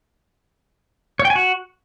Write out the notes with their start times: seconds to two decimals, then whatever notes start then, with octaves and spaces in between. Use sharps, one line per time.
1.19 C#5
1.25 G5
1.30 G#5
1.35 F#4